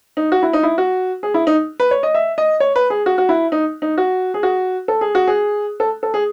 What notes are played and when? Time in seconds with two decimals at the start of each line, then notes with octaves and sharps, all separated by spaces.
0.17 D#4
0.32 F#4
0.43 E4
0.53 D#4
0.63 E4
0.78 F#4
1.23 G#4
1.34 E4
1.47 D#4
1.80 B4
1.91 C#5
2.03 D#5
2.15 E5
2.38 D#5
2.60 C#5
2.76 B4
2.90 G#4
3.06 F#4
3.18 F#4
3.29 E4
3.52 D#4
3.82 D#4
3.98 F#4
4.34 G#4
4.43 F#4
4.88 A4
5.01 G#4
5.15 F#4
5.28 G#4
5.80 A4
6.03 A4
6.14 G#4